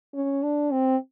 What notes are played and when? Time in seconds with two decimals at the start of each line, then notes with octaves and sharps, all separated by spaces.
0.14 C#4
0.43 D4
0.72 C4